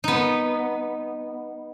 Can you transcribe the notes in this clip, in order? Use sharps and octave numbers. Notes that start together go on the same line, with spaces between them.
B3 D#4